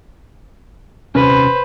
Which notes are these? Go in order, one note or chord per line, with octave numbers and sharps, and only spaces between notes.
D#1 C3 C#4 B4 C5